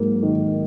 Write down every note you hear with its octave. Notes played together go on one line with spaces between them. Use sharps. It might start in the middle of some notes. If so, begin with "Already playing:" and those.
Already playing: G#2 F#3 A#3
D#3